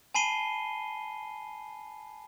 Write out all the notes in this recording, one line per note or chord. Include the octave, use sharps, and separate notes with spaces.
G#5 A5 B5 C7 D#7 G7